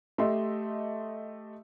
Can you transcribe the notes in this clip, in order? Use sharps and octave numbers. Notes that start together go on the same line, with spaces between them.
A3 G4 D#5 E5 C6